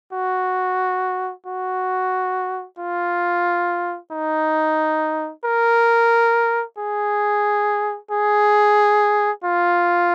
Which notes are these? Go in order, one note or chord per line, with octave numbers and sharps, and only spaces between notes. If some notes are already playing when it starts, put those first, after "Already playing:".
F#4
F#4
F4
D#4
A#4
G#4
G#4
F4